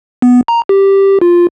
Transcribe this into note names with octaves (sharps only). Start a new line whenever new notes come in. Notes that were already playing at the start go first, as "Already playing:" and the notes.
B3
A#5
G4
F4